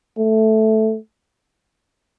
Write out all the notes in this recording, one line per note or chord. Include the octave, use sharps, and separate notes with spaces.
A3